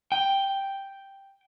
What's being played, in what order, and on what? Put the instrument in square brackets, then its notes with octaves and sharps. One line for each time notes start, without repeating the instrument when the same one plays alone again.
[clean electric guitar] G5